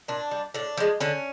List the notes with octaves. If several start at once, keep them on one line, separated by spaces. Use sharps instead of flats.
A#2 D4
G3
A2 D4
F3 G#3
D3 C#4